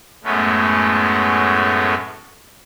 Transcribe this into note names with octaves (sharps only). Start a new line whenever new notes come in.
F#2 A2 G#3 A3 B3 C#4